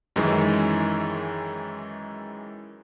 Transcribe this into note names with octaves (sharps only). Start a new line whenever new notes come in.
F#2 D#3 E3 G#3